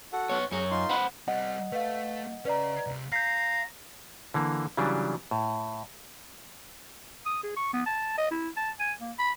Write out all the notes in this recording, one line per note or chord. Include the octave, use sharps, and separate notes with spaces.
F#4 A4 F#5
B3 C#5
F#2 G#4 C#5 A#5
D#4 F4 C6
C5 F#5 B5
G3 C4 D#5 F#5
A3 B4 F5
C#3 C#4 B4 D5 A#5
C2
F5 A#5 G6 B6 C7
D3 E3 A#3
C#3 E3 F#3 G3 D4
A2
D#6
G#4
C#6
B3
A5
D#5
E4
A5
G#5
A#3
B5